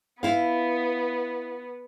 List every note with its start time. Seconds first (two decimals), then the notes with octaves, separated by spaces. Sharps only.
0.23 B3 E4 F5